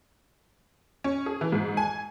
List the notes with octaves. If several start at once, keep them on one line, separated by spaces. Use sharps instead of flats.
C#4
G#4
E3
G#2
G#5